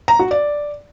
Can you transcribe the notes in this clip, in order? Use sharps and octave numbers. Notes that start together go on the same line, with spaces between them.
A#5
F#4
D5